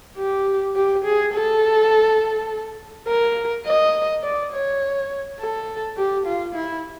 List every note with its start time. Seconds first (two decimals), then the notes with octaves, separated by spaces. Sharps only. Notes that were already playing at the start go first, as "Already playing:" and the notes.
0.18 G4
0.76 G4
1.05 G#4
1.33 A4
3.07 A#4
3.66 D#5
4.23 D5
4.52 C#5
5.39 A4
5.97 G4
6.26 F4
6.55 E4